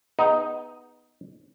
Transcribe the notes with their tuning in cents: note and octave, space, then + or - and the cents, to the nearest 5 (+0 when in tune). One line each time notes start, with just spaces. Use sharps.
B3 +5 D#4 +0 G#4 -15